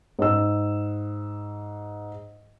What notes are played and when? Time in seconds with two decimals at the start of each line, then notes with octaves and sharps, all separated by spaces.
0.19 G#2 E6